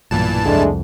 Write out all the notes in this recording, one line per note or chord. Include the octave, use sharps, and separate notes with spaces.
B1 G2 A#2 E3 A5
C2 F2 G#3 A3 D4